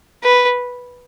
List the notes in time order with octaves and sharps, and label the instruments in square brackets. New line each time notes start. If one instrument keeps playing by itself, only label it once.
[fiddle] B4